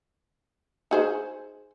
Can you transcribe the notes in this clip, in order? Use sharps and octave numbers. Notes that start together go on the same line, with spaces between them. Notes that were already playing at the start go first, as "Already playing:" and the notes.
D#4 G#4 C5